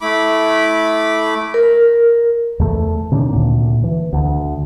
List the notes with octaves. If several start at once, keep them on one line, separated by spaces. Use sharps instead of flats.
A3 E4 B5 D6
A#4
E2 A3
C3 D#3 C#4 D4
D2 A#2
E3
D2